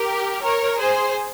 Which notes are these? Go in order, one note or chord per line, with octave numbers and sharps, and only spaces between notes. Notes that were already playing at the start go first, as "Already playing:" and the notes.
Already playing: G4 A#4
A#4 C#5
G#4 C5